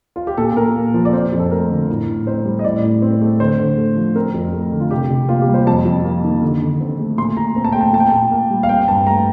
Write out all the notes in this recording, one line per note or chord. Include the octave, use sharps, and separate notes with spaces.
F4
G4
A#2 A4
A#2 A#4
A#3
F3
D5
C4 C5
F2
A4
A3 A#4
D3
A2
A2
C4 C5
G3
D#5
A2 D5
A2
C4
A3
D3 C5
D3
A3
F3
C4 A#4
F2
A3
D3
F4
C3 G4
C3
A#3 F4
G4
G3
C5
F2 A5
F2
A#3
D#3
D3
D3
C4
A3
A#2 C6
A#2 A#5
C4 A#5
A5
A3 G5
A5
A#2 A5
G5
A#2 A5
A#3
G3
F5
C4 G5
G2 A5
A3 A#5